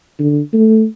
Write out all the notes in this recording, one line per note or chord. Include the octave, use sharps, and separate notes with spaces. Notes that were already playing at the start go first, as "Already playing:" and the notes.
D3
A3